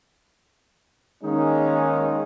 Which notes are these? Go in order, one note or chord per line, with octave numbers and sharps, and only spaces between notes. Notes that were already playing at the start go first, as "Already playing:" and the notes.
D#3 G#3 A#3 C#4 D#4